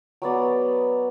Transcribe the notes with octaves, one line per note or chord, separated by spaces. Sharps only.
F#3 B3 D5 D#6